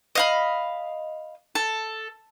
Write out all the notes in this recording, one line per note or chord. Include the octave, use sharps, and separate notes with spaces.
D#5 F5 B5
A4